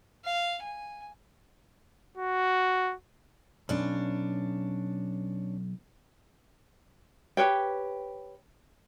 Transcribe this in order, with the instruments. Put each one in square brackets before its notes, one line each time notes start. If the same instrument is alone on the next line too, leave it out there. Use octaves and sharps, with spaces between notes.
[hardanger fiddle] F5
G#5
[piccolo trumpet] F#4
[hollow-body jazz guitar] B1 [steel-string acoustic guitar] C#4 D4
[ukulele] G4 B4 C#5 G5